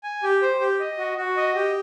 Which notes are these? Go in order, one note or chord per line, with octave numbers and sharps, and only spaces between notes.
G#5
G4
C5
G4
D#5
F#4
F#4
D#5
G4